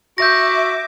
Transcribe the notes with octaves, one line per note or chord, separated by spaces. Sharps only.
F#4 E5 D6 G6 A#6